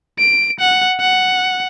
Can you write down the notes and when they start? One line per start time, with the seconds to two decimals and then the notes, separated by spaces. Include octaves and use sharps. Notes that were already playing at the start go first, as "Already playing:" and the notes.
0.19 D7
0.60 F#5
1.00 F#5